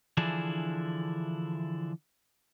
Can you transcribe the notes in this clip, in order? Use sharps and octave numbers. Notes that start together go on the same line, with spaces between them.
D3 E3 F3 D4 E4 G#4